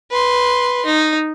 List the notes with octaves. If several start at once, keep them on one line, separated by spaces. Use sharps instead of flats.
B4 C6
D#4